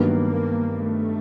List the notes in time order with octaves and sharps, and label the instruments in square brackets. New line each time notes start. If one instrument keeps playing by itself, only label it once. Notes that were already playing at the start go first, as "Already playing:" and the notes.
Already playing: [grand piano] G2 D#3 F#3 B3 [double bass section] A#3
[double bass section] A3